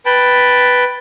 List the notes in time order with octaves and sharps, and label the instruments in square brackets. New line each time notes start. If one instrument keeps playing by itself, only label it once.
[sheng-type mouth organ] B4 G5 A5 B5